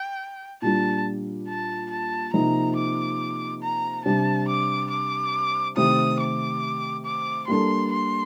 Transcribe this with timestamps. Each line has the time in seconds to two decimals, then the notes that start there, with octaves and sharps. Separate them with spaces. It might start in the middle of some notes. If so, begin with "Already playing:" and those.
Already playing: G5
0.62 A#2 G3 D4 F4 A5
1.49 A5
1.91 A5
2.33 C3 F3 A#3 D#4 A#5
2.77 D6
3.63 A#5
4.05 C3 G3 D4 A5
4.49 D6
4.91 D6
5.77 C3 D#3 A3 C4 G4 D#6
6.20 D6
7.05 D6
7.48 G3 A#3 D4 A4 C6
7.92 C6